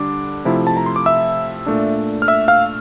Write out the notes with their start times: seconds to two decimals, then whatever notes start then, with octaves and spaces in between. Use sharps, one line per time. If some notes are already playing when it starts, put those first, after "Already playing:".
Already playing: D3 G3 D4 D6
0.45 C3 F3 A3 E4
0.67 A5
0.77 A#5
0.86 C6
0.96 D6
1.06 E5 E6
1.66 A#2 A3 D4
2.22 F6
2.28 E5 E6
2.48 F5 F6